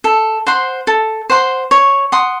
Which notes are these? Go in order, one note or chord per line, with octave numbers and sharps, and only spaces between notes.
A4
C5 F#5 C6
A4
C5 F#5 C6
C#5
F#5 C6 D#6